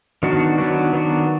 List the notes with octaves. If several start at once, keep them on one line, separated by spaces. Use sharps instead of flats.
D#3 F#3 B3 D4 F#4
D#3 F#3 B3 D4 F#4
D#3 F#3 B3 D4 F#4